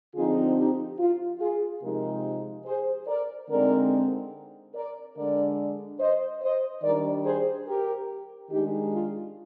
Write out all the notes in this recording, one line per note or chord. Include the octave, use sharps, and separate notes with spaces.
D3 F3 C4 D#4 F4 G#4
D#4 G4
F4
F4 G#4
C3 F3 G#3 D#4 G4 A#4
G#4 C5
A#4 D5
D3 G#3 C4 D#4 A#4 D5
A#4 D5
D3 G#3 D4 A#4 D5
C5 D#5
C5 D#5
D#3 G3 D4 A#4 D5
G#4 C5
G4 A#4
D#3 G#3 D4 D#4 G4
F4